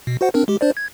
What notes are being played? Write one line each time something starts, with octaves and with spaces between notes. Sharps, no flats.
B2
F#4 C5 F#5
C4 D4 A#4
G#3 G4
D4 C5 D5
G#6